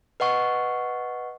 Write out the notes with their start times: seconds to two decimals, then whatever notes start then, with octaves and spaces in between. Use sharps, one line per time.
0.20 B4 D#5 F#5 C#6